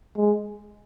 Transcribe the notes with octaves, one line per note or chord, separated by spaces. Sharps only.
G#3